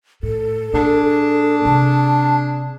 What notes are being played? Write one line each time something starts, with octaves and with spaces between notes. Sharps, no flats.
A2 A4
A#2 D4 G#4
C3 A5